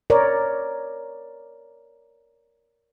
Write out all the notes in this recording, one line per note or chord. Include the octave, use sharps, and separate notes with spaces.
A#4 C#5 D5